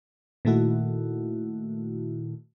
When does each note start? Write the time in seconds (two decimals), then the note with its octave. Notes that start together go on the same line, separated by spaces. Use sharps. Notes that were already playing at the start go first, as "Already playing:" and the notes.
0.45 A#2 D#3 A3 E4 F#4